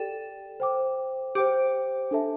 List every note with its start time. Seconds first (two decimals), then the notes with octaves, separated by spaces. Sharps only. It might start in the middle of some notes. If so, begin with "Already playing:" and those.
Already playing: G4 A4 D5 G5
0.60 C5 G5 D6
1.35 G4 C5 G5 D6
2.11 D4 A4 E5 A5